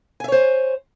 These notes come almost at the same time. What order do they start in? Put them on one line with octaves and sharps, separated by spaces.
G#5 E5 C#5 C5